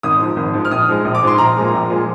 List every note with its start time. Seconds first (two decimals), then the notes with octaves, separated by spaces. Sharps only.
0.03 G#1 D#6
0.19 G#2 F3
0.36 G#1
0.54 G#2 F3
0.65 F6
0.70 A#1 D#6
0.88 G#2 F3 G#3
1.05 A#1
1.15 D6
1.22 G#2 F3 G#3 C6
1.38 A#1 A#5
1.56 A#2 F3 G#3
1.73 A#1
1.90 A#2 F3 G#3